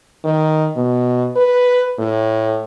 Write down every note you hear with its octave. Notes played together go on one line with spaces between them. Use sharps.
D#3
B2
B4
A2